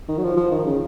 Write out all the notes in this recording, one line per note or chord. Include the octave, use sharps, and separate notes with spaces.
D#3
F#3
F3
F3
D#3
C#3